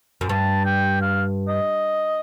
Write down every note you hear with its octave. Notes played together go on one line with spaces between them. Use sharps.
F#2
G2 A5
G5
F5
D#5